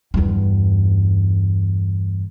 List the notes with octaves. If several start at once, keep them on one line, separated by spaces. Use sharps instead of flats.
E2 G2